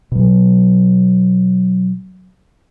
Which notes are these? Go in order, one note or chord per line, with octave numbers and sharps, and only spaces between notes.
B2 F#3